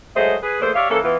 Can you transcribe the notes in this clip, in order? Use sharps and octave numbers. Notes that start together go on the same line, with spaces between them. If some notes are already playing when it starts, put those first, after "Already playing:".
F#3 G#3 A3 G#4 C5 D#5
G#4 B4
E2 A3 A#3 G#4 C5
G4 C#5 D5 E5 F5
E3 A#3 C#4 A4
E3 B3 F4